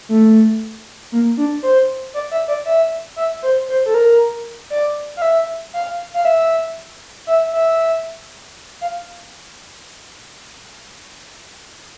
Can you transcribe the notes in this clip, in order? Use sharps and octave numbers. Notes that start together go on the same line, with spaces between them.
A3
A#3
D4
C5
D5
E5
D5
E5
E5
C5
C5
A4
A#4
D5
F5
E5
F5
F5
E5
E5
E5
F5